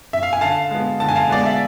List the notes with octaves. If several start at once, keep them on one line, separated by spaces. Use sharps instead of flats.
E5
F5
G#5
D3 F5 A5
G#3 B3
D3 A5
G#5
F5 A5
G#3 B3 D5
E5